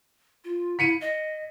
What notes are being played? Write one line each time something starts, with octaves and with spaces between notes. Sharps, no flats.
F4
E4 B6 C#7 D#7
D#5